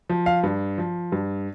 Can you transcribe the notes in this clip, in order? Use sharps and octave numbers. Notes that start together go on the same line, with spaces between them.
F3
F5
G2
F3
G2